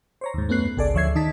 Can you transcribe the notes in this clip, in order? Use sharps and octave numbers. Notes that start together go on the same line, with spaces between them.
C5 C#5 A#5
D#2 G#2
F#2 A3 B3 C#4 F#6 C7
G#1 C#2 G#4 A4 D5
D2 F3 C#5 E5 G#6 C7
D#3 D#4 A5 B6